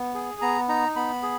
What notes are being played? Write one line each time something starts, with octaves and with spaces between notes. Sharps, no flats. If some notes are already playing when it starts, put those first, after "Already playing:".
Already playing: B3
G#4
B3 A#5
D#4 A#5
B3 B5
G#4